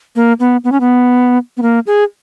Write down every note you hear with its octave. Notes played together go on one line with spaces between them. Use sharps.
A#3
B3
B3
C#4
B3
B3
A#3
G#4